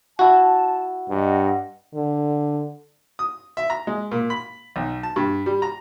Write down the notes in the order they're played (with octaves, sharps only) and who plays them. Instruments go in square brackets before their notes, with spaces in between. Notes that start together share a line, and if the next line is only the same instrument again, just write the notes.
[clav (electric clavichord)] E4 F#4 [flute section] A5
[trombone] G2 [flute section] D#5 F#5
[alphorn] D3
[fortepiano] D#6
E5
A#5
G#3
A#2
B5
B1
A5
G2
G3
A#5